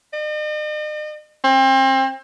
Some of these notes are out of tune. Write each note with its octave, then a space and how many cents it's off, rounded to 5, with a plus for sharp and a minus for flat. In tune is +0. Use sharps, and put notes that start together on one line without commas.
D#5 -45
C4 +30